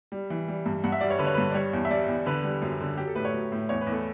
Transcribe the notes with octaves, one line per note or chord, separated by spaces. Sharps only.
G3
E3
G3
G2
G2 F#5
E5
G3 D5
C#5
D3 B4
C#5
G2 B4
D5
G3 C#5
E2
E5
G3 D5
E2
D3 B4
G3
F#2
D3
F#3 G4
A4
A2 B4
C#5
F#3
A2
E2 C#5
B4
E2
A4